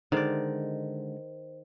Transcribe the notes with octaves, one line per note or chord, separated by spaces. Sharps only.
D3 D#3 G#3 C5 D5